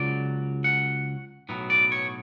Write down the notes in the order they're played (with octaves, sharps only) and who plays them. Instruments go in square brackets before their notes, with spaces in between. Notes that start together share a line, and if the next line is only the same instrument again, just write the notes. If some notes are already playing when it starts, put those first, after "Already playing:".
Already playing: [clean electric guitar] C#2 C#3 F#3 D5
F#5
B1 A2 F#3 B3
D5
C#5